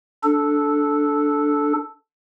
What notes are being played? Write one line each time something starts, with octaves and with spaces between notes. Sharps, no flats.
D4 A4